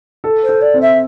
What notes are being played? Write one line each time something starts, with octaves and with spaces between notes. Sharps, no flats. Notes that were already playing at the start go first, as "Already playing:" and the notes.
A4
C5
A4
D5
C4
E5